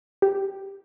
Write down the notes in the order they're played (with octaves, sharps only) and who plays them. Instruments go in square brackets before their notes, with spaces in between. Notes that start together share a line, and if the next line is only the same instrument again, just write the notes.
[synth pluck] G4